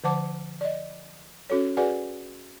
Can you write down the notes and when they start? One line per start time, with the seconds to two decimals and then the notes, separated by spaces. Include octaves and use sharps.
0.04 D3 F3 C5 F#5 A5 D6
0.61 D5 D#5
1.50 C#4 F#4 A4 C#5
1.77 F#4 G#4 B4 D5 F#5 G#5